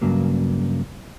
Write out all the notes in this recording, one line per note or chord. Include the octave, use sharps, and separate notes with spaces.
G2 C#3 F#3 A#3